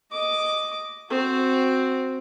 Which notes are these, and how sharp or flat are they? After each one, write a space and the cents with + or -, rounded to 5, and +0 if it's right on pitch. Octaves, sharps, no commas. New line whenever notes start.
D#5 +0 D6 -5
C4 +0 F#4 -5